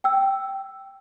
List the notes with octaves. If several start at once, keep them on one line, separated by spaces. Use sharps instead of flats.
G5 E6